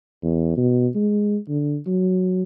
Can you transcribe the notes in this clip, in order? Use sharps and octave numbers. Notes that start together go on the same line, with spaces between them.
E2
B2
G#3
D3
F#3